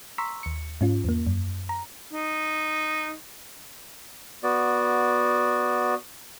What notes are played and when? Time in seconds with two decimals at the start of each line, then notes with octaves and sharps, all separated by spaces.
0.18 A#5 C6 C#6 E6 B6
0.43 D#2 C#7
0.81 G#2 C#4 F4
1.04 E2 A#3
1.27 F#2
1.69 A#5
2.13 D#4
4.43 B3 F#4 D5